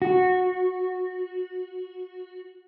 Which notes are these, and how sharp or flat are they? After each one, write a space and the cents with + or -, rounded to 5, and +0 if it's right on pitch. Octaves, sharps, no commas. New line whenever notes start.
F#4 -15